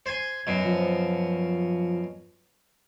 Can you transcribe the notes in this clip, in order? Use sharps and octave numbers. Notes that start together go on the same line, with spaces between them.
C5 G#5 C6
F#2 B2
F3